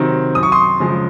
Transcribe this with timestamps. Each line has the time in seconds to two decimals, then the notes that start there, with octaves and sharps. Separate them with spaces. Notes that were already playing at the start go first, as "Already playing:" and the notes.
Already playing: C3 D#3 F#3 C4
0.35 F#2 D#6
0.43 C#6
0.52 C6 D#6
0.80 C#3 F3 G#3